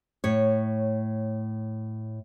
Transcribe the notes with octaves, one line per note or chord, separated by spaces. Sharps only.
A2 C#5